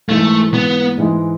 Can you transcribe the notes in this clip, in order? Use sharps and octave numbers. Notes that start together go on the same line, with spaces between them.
G#2 E3 G#3 A3
B3
G#2 E3 G#3